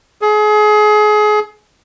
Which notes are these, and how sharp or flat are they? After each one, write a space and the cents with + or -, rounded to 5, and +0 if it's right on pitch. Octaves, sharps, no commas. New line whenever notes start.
G#4 +30